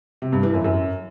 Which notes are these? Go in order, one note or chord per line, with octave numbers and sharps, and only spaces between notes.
C3
G2
E3
F#2
F#2